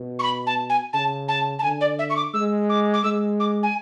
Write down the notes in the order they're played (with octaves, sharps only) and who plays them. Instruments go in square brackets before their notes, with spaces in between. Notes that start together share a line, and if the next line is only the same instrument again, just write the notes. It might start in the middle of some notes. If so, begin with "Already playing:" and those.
Already playing: [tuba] B2
[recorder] C#6
B5
A5
G#5
[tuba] C#3 [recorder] A5
[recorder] A5
A5
[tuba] D3 [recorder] G#5
[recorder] D5
E5
C#6
D6
[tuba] G#3 [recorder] E6
[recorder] D6
D6
[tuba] G#3 [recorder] E6
[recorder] D6
G#5